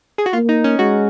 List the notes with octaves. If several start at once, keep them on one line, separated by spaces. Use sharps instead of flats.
G#4
F#4
A#3 F4
D#4
C#4
G#3 F#4